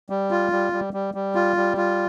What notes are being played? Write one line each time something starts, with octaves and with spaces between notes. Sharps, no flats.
G3
F4
G3
G3
G3
G3
F4
G3
F4